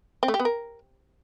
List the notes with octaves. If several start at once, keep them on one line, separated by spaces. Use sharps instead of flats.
C4
A3
G4
B3
A#4